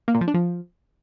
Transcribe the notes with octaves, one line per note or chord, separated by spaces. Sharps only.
A#3
A#2
F3
D4
F3